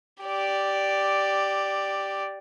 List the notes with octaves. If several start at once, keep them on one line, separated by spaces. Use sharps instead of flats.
G4 D5